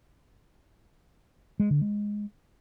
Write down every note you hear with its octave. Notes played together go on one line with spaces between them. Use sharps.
G#3
D3
G#3